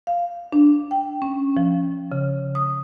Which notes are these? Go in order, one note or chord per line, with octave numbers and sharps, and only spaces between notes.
F5
D4
G5
C#4
F3
C#3
D#6